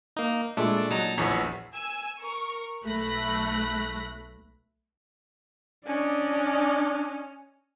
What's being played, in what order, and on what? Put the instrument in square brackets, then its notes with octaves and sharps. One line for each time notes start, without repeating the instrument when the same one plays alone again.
[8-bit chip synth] A#3 D#4
[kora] A#2 G#3 [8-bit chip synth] A3 D4 [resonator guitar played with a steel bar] E4
[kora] D5
[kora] F#3 [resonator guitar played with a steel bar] D#4 [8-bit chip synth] A5 A#5
[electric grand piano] A#1 E2 [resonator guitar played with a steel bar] E3 B3 [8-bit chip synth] C#5
[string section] G#5 E6
A#4 C#6
B1 A3 B5 F#6 A#6
[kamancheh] C#4 [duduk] D4 [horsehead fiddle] D5 D#5